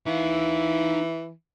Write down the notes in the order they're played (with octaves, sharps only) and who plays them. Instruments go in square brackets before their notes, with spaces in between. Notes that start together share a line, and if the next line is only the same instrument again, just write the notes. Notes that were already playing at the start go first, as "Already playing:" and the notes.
[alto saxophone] E3 [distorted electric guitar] D#4 F5